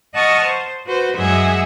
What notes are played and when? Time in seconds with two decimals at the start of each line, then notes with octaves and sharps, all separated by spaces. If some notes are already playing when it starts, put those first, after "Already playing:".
0.13 D#5 F#5 A5 C#6 D#6 F6
0.45 C5
0.85 F#4 B4 C5
1.17 F#2 G#3 G#4 E5 F#5